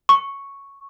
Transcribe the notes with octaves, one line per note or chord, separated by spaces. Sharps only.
C#6